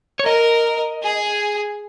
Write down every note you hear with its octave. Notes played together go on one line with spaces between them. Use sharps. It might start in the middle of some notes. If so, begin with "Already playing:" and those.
C#5
A#4 D#5
G#4